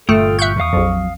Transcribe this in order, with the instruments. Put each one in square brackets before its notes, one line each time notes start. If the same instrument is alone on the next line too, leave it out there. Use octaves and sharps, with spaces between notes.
[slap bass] G1 G2 A#2 [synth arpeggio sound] A3 [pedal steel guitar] F4 G5 D#6 [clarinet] A4
[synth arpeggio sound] E5 F#6 G6 [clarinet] C#6
[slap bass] E2 [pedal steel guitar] F5 D#6
[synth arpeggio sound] A#1 F2 [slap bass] F#3